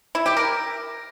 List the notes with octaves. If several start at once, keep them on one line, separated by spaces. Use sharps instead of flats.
E4
G4
A#4